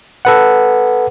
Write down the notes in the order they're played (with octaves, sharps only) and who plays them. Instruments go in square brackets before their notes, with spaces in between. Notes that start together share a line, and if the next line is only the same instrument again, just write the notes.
[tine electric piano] A4 B4 F#5